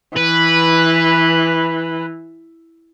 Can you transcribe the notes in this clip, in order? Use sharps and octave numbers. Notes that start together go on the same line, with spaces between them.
E3 B4